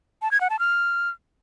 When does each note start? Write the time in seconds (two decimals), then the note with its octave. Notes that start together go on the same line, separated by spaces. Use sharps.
0.22 A5
0.31 G#6
0.41 F#5
0.50 A5
0.59 F6